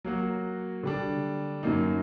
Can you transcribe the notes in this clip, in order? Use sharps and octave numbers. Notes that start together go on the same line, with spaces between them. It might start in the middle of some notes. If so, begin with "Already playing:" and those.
F#3 A#3 F#4
D3 G3 D4
F#2 F#3 A#3 D#4